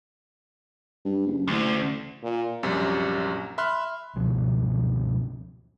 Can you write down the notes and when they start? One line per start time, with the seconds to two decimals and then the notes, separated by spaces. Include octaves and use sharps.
1.05 G2
1.27 F#1
1.48 A1 D2
2.23 A#2
2.63 A#1 F#2 C3 G3
3.58 E5 B5 C6 F6 F#6
4.15 G1 C#2 B2 F3